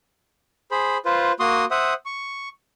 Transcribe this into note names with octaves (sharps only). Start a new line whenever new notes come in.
G#4 C5 B5
F4 B4 C5
A#3 F#4 C6 D#6
C5 E5 F#5 D#6
C#6